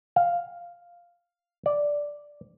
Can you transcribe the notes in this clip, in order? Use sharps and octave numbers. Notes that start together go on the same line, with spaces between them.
F5
D5